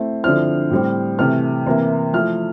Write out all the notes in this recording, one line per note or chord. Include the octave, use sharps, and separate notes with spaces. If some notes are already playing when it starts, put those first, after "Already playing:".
Already playing: A3 C4 E4
D3 F3 C4 E4 F6
A2 G3 C4
C3 E3 A3 F6
C3 E3 A#3 E4
F3 A3 E4 F6